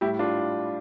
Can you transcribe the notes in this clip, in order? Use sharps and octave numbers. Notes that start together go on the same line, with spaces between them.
A2 G3 E4 G4
D4 F4